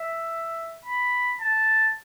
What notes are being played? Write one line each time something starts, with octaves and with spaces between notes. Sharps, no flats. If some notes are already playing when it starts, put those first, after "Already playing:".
Already playing: E5
B5
A5